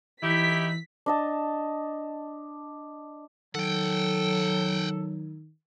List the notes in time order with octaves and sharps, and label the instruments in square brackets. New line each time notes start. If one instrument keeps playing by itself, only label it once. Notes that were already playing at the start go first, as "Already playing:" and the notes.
[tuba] E3 [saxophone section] D#4 E4 [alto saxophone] G4 [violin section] B6
[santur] D4 D#5 A5
[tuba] D#3 [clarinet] F#3 [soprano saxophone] A4 [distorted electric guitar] F#5 G5